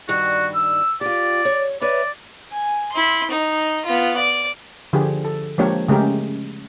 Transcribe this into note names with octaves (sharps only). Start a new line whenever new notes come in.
G2 D#3 G3 F#4
E6
F4 G4 D5
C#5
B4 C#5 D5 E5
G#5
E4 C6
D#4
B3 F4
D5
D3 F3 F4 G4 G#4
A4
F3 G#3 A#3 D4 G4 C#5
C#3 G#3 A3 C#4 G4 A#4